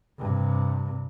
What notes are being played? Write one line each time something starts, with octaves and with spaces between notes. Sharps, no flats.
G2 C3